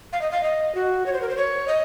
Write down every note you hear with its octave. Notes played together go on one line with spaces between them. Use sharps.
F5
D#5
F5
D#5
F#4
C#5
C5
A#4
C5
C#5
D#5